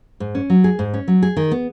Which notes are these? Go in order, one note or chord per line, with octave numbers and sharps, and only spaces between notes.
G#2
C#4
F#3
G#4
G#2
C#4
F#3
G#4
D#3
B3